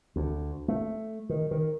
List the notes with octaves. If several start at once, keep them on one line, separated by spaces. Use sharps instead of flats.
D2
A3
D#3
D#3